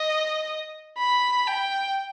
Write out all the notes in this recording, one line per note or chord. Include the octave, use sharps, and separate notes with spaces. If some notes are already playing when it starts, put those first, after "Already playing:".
Already playing: D#5
B5
G5